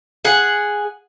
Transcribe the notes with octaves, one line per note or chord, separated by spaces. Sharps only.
G#4 F#5